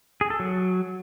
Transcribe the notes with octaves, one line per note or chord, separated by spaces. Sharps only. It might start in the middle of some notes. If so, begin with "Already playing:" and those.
G#4
A4
F#3